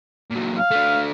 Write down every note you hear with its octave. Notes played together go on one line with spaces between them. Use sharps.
A#2 F#3
F5
A3 D4